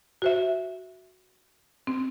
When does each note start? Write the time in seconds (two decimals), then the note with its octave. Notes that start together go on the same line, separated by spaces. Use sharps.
0.22 F#4 C5 E5
1.87 C4